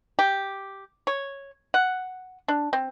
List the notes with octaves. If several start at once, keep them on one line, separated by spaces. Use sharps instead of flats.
G4
C#5
F#5
D4
C4